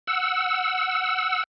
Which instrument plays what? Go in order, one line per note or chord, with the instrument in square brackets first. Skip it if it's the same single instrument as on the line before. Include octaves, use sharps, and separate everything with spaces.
[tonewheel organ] F#5 E6